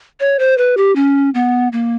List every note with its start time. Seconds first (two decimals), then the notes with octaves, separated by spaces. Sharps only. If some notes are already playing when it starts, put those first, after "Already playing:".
0.20 C#5
0.39 C5
0.58 B4
0.77 G4
0.96 C#4
1.34 B3
1.72 A#3